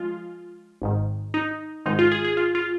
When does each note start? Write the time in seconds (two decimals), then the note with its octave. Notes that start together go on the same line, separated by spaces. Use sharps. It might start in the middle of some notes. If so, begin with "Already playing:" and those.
Already playing: F3 G#3 F4
0.82 G#1 G#2 D#3
1.34 D#4
1.86 G#1 G#2 D#3 G#3 D#4
1.99 F4
2.12 G#4
2.24 G#4
2.37 F4
2.55 F4